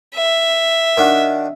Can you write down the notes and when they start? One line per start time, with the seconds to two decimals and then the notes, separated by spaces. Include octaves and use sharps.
0.15 E5
0.97 D#3 D4 F#4